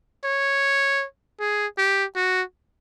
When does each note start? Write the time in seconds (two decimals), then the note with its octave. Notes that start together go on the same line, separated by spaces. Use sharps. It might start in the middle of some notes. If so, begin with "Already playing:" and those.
0.24 C#5
1.40 G#4
1.78 G4
2.16 F#4